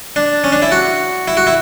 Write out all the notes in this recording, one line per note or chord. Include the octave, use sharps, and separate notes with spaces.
D4
C#4
D4
E4
F#4
E4
F#4
E4